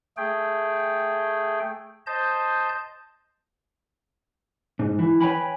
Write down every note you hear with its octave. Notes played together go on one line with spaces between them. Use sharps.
A3 G#4 G5
C5 D#5 A5 G6
G#2
E3
B4 C#5 G5 G#5 B5